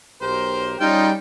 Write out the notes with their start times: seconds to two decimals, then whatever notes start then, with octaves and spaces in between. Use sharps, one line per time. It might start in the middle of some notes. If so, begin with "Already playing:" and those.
0.21 B1 G4 A#4 C5
0.80 G3 C#4 D#4 F4 G#4 G5